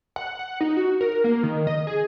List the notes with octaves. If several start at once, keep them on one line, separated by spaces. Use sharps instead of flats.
F#5
F#5
D#4
F#4
A#4
A#3
D#3
D#5
G#4